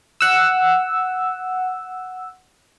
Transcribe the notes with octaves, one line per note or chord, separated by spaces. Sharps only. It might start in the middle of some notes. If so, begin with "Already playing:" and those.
F#5 E6